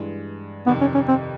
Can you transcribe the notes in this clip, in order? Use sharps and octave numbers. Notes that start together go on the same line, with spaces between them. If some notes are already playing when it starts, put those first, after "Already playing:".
Already playing: G2 E3 G#3
F2 C3 D#3 B3
C#4
C#4
C4